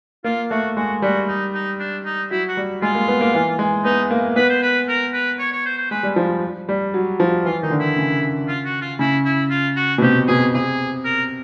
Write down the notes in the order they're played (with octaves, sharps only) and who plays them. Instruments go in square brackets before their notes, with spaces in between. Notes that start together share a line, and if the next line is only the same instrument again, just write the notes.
[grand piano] A#3 [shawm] F4
[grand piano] A3 [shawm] F#4
[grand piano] G#3 [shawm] F#4
[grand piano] G3 [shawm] F#4
[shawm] D#4
D#4
D4
D#4
[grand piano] F#3 [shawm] E4
[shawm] F#4
[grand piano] G3
[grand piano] G#3 [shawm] F4
[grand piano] A#3
B3
A#3
E3
G#3
[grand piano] B3 [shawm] D#4
[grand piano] A#3
[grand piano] B3 [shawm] B4
[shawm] C5
B4
A#4
B4
C#5
C#5
C5
C5
[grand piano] G#3 [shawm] B4
[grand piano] G3
F3
G3
F#3
F3
[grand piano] E3 [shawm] F4
[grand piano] D#3 [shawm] D#4
[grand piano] D3
[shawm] E4
[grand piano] C#3
[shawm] F4
F#4
F4
[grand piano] C#3 [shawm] E4
[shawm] E4
F4
F#4
[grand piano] B2
[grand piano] C3 [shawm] G4
[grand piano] B2 [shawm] G#4
[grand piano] C3 [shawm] G#4
[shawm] A#4